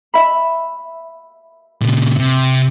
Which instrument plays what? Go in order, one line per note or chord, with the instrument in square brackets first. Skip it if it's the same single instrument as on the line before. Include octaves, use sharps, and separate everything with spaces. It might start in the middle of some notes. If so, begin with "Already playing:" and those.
[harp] E5 B5
[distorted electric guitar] A#2 C#3
C3